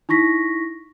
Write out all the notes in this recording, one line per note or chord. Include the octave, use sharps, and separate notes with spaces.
D#4 E4 C#6 A#6 B6